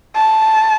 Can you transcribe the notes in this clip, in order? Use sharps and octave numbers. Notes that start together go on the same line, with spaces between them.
A5